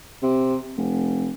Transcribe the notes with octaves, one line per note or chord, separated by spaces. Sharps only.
C3
F1